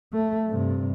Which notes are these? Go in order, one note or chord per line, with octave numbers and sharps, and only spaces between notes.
A3
G2 C3